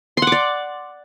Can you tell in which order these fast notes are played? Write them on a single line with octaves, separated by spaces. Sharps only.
C6 F#5 D6 D5